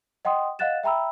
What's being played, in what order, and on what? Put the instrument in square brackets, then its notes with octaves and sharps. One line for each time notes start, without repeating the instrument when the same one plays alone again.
[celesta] D#5 F#5 G5 C6 D#6
D#5 F5 F#5 F#6 A6 E7
E5 G5 A#5 B5 E6